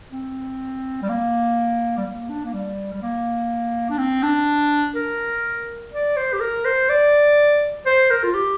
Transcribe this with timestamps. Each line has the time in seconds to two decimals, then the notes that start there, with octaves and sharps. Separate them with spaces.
0.11 C4
1.02 G3
1.09 A#3
1.97 G3
2.05 A#3
2.29 D4
2.45 A#3
2.53 G3
2.93 G3
3.02 A#3
3.90 D4
3.98 C4
4.23 D4
4.95 A#4
5.92 D5
6.16 C5
6.33 G4
6.40 A#4
6.65 C5
6.89 D5
7.86 C5
8.11 A#4
8.23 F4
8.34 G4